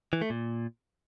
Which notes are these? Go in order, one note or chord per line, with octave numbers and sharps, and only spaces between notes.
E3
A3
A#2